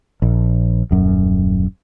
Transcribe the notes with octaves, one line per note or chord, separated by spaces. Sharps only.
A#1
D#1 F#2